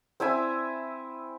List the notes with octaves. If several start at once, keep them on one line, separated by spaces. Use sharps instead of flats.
C4 E4 E5 G#5